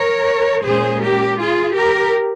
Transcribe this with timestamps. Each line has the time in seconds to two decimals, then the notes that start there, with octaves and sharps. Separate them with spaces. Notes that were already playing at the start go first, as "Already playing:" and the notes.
Already playing: A#4 C#5
0.64 A#2 G#3 C#4 G#4 C5
1.01 G4 A#4
1.38 F4 G#4
1.74 G4 A#4